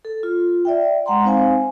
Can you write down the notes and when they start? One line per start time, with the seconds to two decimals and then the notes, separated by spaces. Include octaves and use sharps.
0.05 A4
0.23 F4
0.65 D5 E5 G5
1.06 G#3 F#5 A#5 C6
1.24 C4 D#4 C5 F5 G#5